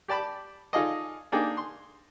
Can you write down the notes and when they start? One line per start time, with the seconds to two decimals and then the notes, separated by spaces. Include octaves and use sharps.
0.08 G4 D5 A5 B5 D6
0.73 D#4 F4 G#4 A4 D5 D#5
1.32 A#3 D4 D#4 G#4 G5
1.57 C6